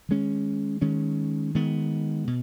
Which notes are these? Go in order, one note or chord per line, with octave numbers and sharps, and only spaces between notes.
D#3 G#3 C#4
D#3 G#3 C#4
D#3 G#3 B3
B2